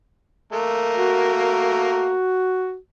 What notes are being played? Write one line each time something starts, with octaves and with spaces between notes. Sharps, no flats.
A3 A#3 A#4
F#4